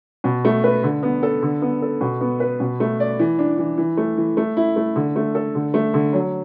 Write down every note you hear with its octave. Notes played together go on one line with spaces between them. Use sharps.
B2
A3
B4
D3
B3
A4
D3
B3
A4
B2
B3
B4
B2
A3
D5
E3
D4
E3
E3
A3
E3
A3
E4
A3
D3
A3
A4
D3
A3
D3
F#3